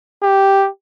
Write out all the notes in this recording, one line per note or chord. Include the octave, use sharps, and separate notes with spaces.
G4